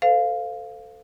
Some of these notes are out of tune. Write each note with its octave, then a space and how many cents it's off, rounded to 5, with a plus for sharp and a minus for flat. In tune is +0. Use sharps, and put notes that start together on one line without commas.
A4 +10 C5 -35 F5 +0